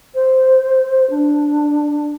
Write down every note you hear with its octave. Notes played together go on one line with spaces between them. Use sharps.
C5
D4